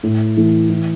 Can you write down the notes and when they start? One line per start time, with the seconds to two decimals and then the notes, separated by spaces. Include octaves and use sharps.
0.03 A2
0.37 E3 A3
0.70 E3